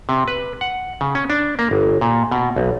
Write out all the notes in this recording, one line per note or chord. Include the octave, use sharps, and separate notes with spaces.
C3
B4
F#5
C#3
C#4
D4
A#3
G1
A#2
B2
B1